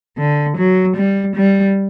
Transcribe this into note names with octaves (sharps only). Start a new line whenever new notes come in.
D3
F#3
G3
G3